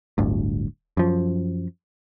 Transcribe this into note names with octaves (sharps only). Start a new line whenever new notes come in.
D1 G1 D2
F#2 F3